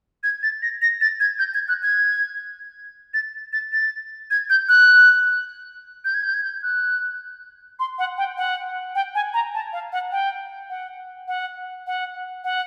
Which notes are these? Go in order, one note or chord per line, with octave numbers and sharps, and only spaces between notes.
G#6
A6
A#6
A#6
A6
G#6
G6
G#6
F#6
G#6
A6
A6
A6
G#6
G6
F#6
G6
G#6
G6
G#6
G6
F#6
C6
F#5
G5
F#5
G5
G#5
A#5
A5
F5
F#5
G5
F#5
F#5
F#5
F#5